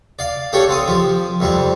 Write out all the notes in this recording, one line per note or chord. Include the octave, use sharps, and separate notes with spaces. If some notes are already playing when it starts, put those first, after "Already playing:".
D5 F5
D4 G4 A4 C#5 F5
C4 F5 D#6
F3 G4
F2 G3 C4